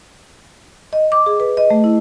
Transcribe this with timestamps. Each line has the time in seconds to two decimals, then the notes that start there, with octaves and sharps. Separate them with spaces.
0.93 D#5
1.12 D6
1.26 G#4
1.40 B4
1.57 D#5
1.71 A3
1.84 E4